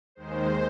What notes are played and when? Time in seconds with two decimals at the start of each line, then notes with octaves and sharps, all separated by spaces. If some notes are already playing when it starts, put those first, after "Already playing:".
0.15 D#2 D#3 G#3 C5